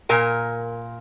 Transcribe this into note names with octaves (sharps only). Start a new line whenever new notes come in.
A#2 A#4 G#5